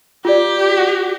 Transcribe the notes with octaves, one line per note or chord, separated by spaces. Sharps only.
F4 G4 D5